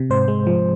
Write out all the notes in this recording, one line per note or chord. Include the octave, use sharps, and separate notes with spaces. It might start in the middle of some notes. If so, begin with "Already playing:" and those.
Already playing: C3
G#2 C5
G#3
F3